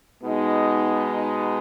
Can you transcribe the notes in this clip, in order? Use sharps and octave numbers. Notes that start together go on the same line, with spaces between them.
B2 G#3 B3 D#4